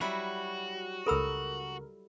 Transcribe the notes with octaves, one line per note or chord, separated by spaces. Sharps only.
F#3 G3 E4 F#4
C#2 A4 A#4 B5 E6